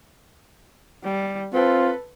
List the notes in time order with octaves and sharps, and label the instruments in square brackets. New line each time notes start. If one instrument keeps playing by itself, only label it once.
[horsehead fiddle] G3
[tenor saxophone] C4 [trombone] F4 [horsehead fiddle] A4 B4